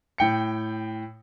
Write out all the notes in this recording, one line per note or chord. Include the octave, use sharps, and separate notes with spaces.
A2 G5 C#7